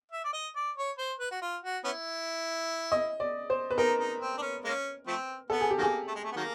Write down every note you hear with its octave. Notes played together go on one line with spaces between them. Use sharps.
E5
D5
D#5
D5
C#5
C5
B4
F#4
F4
F#4
B3 C#4 E4
D#5
D5
C5
B4
D#4 A#4
D#4
C4
D4
C#4
G#3 A#3 C#4
F3 A3 C4
B3 A4
G#4
G4
D#3 F#3 A#3 G#4
A3
G#3
A3
B3
D#3 F#3 A#3